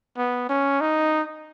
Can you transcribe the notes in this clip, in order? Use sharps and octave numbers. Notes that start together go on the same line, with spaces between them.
B3
C#4
D#4